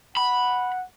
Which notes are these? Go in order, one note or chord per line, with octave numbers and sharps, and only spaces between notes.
F#5 B5